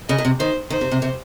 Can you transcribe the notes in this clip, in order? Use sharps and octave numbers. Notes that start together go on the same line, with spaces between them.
C#3 D#5
A#2
C3
D#3 C5
D#3 C5
C3
C3
C3